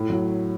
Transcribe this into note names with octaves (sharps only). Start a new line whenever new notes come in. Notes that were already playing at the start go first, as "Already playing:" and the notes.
Already playing: A2
F#3